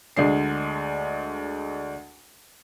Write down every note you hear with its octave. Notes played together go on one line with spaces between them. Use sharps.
D2 G#3 D4 C7